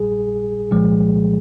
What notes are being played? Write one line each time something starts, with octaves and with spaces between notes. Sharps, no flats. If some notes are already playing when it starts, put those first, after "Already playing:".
Already playing: A#1 A#2 G3 G#4
C2 A#2 F3 G#3